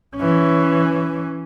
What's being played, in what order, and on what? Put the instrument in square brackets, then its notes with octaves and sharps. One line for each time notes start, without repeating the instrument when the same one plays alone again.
[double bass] E3 C#4